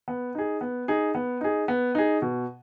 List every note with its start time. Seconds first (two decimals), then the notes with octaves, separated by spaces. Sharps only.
0.08 B3
0.35 D#4 G#4
0.61 B3
0.88 D#4 G#4
1.15 B3
1.41 D#4 G#4
1.68 B3
1.95 D#4 G#4
2.22 B2